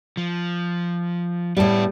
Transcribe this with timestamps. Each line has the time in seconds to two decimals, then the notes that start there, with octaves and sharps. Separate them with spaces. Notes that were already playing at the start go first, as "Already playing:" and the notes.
0.17 F3
1.57 A2 G3 B3 A5